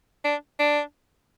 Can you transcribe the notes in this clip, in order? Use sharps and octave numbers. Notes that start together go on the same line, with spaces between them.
D4
D4